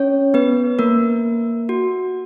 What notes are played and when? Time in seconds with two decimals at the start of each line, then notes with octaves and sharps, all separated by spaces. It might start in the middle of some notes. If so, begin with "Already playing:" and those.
Already playing: C#4 C#5
0.34 B3 B4
0.79 A#3 A#4
1.69 F#4